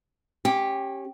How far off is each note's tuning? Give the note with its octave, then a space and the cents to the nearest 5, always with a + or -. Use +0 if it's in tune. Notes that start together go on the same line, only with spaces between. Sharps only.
C#4 -25 G4 +0